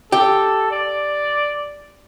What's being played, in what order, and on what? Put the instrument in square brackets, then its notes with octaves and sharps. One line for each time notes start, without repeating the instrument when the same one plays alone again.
[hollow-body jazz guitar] G4 [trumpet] A4
[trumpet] D5